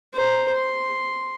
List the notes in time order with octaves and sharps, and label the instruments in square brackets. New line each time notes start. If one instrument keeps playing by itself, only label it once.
[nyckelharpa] C5 A#5
C6